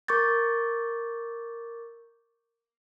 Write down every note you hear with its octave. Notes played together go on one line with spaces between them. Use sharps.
A#4 C#6 D6 G6 A6